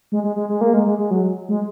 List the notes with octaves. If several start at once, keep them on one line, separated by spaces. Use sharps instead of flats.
G#3
G#3
G#3
G#3
A#3
G#3
G#3
G#3
F#3
G#3